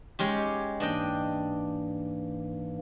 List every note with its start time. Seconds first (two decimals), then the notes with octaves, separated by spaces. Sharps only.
0.19 G#3 C#4 G4
0.80 G#2 E3 A#3 D4 D#5 G5